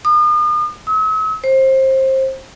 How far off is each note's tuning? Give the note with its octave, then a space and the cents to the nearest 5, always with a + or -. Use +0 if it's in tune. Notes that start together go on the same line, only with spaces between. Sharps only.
D#6 -40
E6 -45
C5 +25